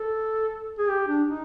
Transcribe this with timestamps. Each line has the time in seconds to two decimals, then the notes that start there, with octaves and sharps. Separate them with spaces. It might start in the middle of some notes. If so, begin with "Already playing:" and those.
Already playing: A4
0.79 G#4
0.89 G4
1.08 D4
1.28 D#4